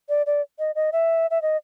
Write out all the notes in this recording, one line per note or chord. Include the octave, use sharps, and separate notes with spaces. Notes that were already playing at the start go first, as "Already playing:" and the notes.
D5
D5
D#5
D#5
E5
E5
D#5